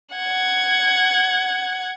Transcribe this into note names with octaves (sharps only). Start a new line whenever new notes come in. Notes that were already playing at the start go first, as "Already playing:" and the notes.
F#5 G#6